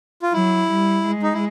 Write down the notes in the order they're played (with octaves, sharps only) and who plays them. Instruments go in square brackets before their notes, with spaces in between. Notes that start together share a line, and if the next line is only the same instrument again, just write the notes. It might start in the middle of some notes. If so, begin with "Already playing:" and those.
[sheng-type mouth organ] F4
[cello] F#3 [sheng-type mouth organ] E4
[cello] G3
G#3
[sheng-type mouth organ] D#4
E4